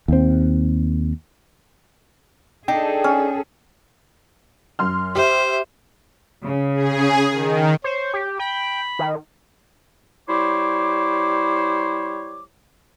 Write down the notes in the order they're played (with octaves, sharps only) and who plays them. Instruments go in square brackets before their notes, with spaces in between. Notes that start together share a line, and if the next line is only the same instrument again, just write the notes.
[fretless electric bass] D#2 C4
[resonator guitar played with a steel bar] D4 D#4 [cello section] G#4 A4 [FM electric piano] G5
[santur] C#4
[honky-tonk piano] F#2 C6 F6
[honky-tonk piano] G4 E5 [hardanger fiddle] C5
[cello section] C#3
[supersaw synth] G#4
D#3
[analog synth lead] C5 [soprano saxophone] C#5
[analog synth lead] G4
[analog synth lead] G5 [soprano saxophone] B5
[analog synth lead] D#3
[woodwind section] G3 E4 C5 C#5 D6